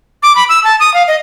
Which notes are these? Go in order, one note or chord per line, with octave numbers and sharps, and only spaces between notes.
D6
B5
E6
A5
D#6
F5
D#5